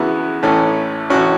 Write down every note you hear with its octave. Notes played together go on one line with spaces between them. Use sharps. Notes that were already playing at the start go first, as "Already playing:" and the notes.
Already playing: E2 C#3 E3 B3 E4 F#4
A1 A2 E3 A3 C#4
A1 A2 E3 C#4 F#4